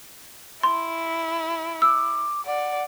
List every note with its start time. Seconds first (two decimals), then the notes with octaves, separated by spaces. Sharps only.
0.63 E4 C6
1.82 D6 E6
2.46 D5 F#5